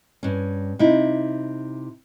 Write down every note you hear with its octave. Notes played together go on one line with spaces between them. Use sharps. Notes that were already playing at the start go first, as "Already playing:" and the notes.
G2 C#4
C3 D#4 E4